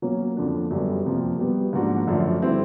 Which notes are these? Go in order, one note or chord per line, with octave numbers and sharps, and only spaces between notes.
B2 F#3 A#3 C#4
F2 D3 F3 A#3 D4
F#2 D3 G3 B3
F2 C3 F3 A#3
B2 G3 B3
G#2 F3 A#3 D4 F#4
F#2 D3 F3 A3
D3 G3 C4 E4